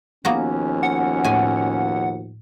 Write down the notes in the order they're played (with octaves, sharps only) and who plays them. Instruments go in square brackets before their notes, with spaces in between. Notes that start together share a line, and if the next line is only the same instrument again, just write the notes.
[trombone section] D#2 B2 F3 [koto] A#3 B3 F#4 [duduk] C#4
[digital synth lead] F#5
[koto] A2 G#5